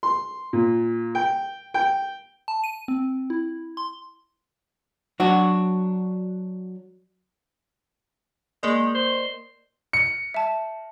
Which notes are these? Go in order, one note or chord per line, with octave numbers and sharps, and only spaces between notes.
C6
A#2
G5
G5
A5
D#7
C4
E4
C6
F#3 D4 F#4
G#3 A#3 A#4 D5
C5
C#7
E5 A5